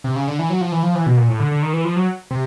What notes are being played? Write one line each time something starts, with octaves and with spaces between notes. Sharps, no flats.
C3
C#3
D3
E3
F#3
F3
E3
F3
E3
B2
A#2
A2
D3
D3
D#3
E3
F3
F#3
C3